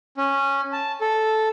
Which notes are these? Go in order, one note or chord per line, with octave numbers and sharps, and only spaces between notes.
C#4
A5
A4